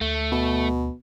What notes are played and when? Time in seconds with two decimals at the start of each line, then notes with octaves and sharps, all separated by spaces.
0.01 D2 A3
0.32 B2